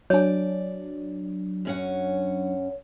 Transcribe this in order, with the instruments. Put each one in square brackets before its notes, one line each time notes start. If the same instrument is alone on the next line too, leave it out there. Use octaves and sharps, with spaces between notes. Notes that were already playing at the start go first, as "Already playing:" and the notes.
[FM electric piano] F#3 D4 [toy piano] C#5 G#5 [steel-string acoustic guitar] D5
[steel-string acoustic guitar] F#2 C#4 F#5